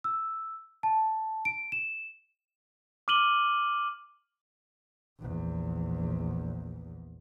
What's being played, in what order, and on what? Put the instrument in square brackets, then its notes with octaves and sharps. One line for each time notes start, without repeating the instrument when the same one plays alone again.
[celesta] E6
A5
D7
E7
[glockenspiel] D6 F6 D#7 F#7 G7
[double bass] A#1 E2